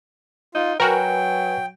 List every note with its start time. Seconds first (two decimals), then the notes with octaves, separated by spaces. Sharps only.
0.55 D#4 F4
0.80 F#3 F#4 A#4 B4 G5 G#5